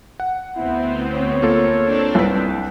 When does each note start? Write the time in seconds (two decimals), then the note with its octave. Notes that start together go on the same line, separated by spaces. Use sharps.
0.20 F#5
0.56 D2 B3 C4 E4
1.13 C#5
1.42 A#3 F4 A4
1.86 C4 D4
2.15 C2 B4 B6